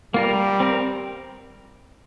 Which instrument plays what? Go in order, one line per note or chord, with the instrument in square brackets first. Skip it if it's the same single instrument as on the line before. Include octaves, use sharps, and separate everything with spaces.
[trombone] G3 [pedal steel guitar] A#3 F4 A#4
[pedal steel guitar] C4 A#4